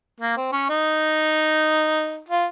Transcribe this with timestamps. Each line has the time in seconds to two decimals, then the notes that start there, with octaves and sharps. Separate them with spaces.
0.21 A#3
0.37 C4
0.52 C#4
0.69 D#4
2.29 F4